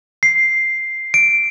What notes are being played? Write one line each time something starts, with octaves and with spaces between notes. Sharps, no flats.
C7
D7